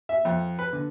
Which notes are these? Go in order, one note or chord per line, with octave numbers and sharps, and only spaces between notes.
E5
F2
B4
D3